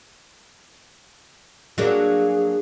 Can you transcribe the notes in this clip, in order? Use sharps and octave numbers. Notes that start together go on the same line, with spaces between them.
F#3 A#3 D4 G#4